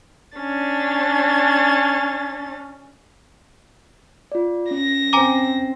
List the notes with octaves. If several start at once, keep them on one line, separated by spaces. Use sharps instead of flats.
C#4 D4 A6
F4 D5
C#4 A#6
C4 G#5 A#5 D6